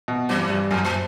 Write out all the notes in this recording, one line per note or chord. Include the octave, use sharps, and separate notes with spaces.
B2
E2 G2 E3
G2
F#2 A2
A2